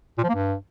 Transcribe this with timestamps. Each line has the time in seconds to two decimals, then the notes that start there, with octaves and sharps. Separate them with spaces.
0.18 A#2
0.24 F3
0.29 A#3
0.35 G2